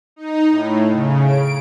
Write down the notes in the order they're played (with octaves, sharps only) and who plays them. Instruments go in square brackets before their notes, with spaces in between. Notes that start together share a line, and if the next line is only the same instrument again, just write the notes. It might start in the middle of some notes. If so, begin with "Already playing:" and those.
[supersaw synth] D#4
A2
C#3
D7